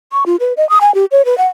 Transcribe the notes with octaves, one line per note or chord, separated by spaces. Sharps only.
C#6
F4
B4
D#5
D#6
G#5
G4
C#5
B4
F#5